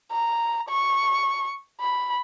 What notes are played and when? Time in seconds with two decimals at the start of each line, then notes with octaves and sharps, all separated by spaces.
0.12 A#5
0.69 C#6
1.80 B5